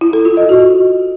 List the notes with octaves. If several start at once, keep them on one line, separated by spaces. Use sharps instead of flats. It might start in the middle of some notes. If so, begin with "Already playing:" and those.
E4
A4
F4
D#5
F#4